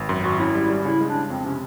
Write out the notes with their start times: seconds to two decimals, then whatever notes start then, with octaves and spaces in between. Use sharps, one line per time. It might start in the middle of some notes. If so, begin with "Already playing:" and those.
Already playing: G#1
0.09 F#2
0.24 G#1 F#4
0.39 C#4 E4
0.55 G3
0.70 G3
0.85 C#3 E4
1.01 G#3
1.08 D4
1.14 C#3
1.30 F2 C4
1.46 C3 C#4